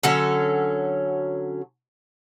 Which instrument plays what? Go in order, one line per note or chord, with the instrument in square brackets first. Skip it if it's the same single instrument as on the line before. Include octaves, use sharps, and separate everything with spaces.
[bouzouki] D3 F#3 C#4 A4